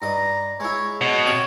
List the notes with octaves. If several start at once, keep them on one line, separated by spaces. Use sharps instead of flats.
G2 D#5 A#5
G#3 E4 C#5
B2 C#5
C3 C#5 D#6